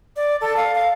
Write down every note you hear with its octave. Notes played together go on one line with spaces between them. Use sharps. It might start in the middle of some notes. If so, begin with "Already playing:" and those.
D5
A4
F5
F5